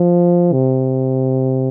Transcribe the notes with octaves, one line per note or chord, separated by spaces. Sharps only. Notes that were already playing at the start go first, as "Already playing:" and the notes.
Already playing: F3
C3